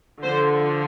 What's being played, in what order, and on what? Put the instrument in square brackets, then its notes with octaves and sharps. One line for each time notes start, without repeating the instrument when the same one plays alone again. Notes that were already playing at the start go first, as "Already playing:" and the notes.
[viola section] D3 F3 C5